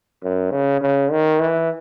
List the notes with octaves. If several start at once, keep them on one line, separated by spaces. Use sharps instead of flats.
F#2
C#3
C#3
D#3
E3